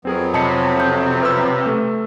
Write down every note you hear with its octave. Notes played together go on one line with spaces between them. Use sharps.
F2 F#3 B3 C4 G#4 A#4
C3 D#5 A5 B5 C#7
G6
B4 B5 E6 F6
A3